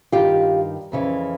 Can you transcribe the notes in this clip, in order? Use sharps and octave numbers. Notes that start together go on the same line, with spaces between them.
G2 D#3 F4 G4
F2 C#3 E3